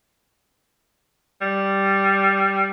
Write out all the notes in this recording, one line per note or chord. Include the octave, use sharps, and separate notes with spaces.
G3